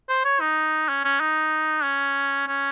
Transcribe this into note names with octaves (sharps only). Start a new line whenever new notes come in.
C5
C#5
D#4
C#4
C#4
D#4
C#4
C#4